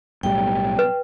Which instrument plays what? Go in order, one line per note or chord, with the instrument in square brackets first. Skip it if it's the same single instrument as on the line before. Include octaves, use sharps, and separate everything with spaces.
[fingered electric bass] B1 A2 G3 [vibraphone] G5
[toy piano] B4